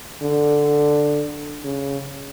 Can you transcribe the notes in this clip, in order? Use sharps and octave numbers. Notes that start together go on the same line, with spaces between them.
D3
C#3